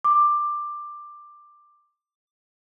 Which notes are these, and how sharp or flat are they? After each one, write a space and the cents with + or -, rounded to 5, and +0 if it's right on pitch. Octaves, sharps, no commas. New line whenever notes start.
D6 +15